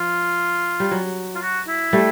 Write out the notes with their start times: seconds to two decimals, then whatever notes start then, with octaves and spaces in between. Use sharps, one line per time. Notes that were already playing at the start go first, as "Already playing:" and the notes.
Already playing: F3 F4
0.80 G3
0.91 F#3
1.35 F4
1.42 F#4
1.68 E4
1.93 G3 A3